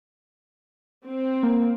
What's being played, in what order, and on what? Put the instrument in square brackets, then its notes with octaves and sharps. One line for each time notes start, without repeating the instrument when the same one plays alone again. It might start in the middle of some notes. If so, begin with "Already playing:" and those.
[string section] C4
[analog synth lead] A#3